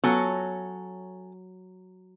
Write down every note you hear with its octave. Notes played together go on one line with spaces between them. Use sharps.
F#3 B3 C#4 F4 F#4 A4